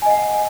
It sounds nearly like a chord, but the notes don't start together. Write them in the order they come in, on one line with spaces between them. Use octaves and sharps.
G#5 D#5 F#5